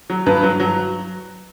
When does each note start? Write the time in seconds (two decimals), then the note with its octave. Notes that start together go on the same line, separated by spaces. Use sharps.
0.10 F#3
0.26 G2 B4
0.43 F#3
0.60 F#3